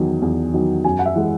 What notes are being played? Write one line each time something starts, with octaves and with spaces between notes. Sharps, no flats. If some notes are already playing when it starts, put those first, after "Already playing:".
Already playing: E2 D#3 F#3
E2
D#3 F#3
F#2 G#5
F#5
E5
E3 G#3